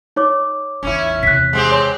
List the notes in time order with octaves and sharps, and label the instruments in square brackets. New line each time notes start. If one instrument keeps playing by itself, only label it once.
[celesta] D#4 C#5 D6
[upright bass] A1 E2 [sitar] C#4 E4
[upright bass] E2 C3 [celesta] F#6 B6
[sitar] G#3 C4 G4
[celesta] C#5 C6